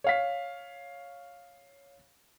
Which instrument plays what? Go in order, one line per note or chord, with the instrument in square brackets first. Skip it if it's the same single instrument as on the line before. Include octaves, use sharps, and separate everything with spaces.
[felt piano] C#5 F5 B6